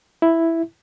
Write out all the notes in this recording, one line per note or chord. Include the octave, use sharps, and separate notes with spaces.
E4